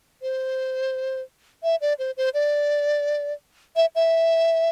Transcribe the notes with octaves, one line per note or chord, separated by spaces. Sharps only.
C5
E5
D5
C5
C5
D5
E5
E5